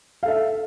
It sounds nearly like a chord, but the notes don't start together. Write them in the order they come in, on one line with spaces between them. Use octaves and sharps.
F5 A4 E5